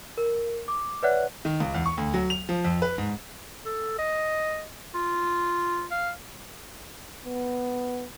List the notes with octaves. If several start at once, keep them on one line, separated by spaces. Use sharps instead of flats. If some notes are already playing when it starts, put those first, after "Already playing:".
A#4
D6
B4 C#5 D5 E5 F#5 F#6
D#3
C#2
E2
C#6
D2
F#3
F7
F3
F2
B4
G#2
A4
D#5
F4
F5
B3